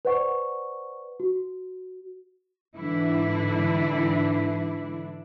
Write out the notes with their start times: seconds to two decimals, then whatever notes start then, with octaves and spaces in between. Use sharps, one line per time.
0.05 B4 C5 D5 F#5 C#6
1.20 F#4
2.75 G#2 D3 E3 D4 E4